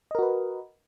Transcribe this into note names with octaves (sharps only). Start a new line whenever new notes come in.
F#4 A#4 B4 D#5